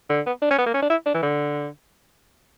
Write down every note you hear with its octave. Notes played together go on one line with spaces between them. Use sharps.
D3
B3
D4
C#4
B3
A#3
C#4
D4
E4
D4
E3
D3